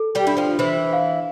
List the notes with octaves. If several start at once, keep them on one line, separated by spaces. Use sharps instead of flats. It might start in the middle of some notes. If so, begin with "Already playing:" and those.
Already playing: A4
G3 G4
D4 E4
F3 F4
E3 E4 C5
F5